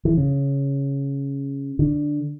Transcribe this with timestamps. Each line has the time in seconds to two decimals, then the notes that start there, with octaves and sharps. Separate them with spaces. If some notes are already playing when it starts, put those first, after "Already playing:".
0.05 E3
0.17 C#3
1.79 D3